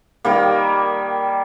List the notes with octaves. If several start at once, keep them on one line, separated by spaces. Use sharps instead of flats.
D#3 G3 A#3